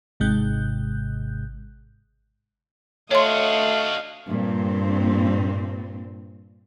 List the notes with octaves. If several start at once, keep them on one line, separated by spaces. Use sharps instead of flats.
G#1 G#2 C3 G#3 F#6 G6
A3 D4 F#4 C#5 D#5 F5 C6
G2 A#2 C4